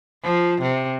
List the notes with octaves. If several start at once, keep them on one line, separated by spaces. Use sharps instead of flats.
F3
C3